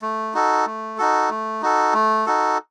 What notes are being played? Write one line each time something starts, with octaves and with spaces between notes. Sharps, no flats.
A3
D#4 F#4 A4
A3
D#4 F#4 A4
A3
D#4 F#4 A4
A3
D#4 F#4 A4